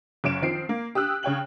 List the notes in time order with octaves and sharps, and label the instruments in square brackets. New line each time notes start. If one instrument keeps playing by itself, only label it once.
[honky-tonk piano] F#1 F#2 C#4 D7 E7
D#3 F3 C4 C7 D7
A#3
G4 D#6 E6 F#6
C#3 C#5 G5 F#7